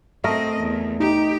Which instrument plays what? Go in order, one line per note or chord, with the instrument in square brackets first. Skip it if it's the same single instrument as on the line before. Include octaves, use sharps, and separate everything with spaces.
[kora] A3 A#4 [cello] C4 D#5
[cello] E2
[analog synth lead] D#4 [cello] G4